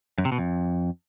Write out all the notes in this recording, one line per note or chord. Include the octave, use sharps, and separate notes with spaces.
F#2
C3
B2
F2